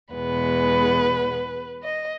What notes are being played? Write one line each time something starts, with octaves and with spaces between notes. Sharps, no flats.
E2 B2 G#3 B3 B4
D#5